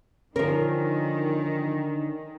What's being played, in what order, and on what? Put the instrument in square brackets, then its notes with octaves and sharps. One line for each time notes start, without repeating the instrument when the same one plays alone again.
[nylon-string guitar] D3 [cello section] D#3 [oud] F3 A#4 [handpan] C#4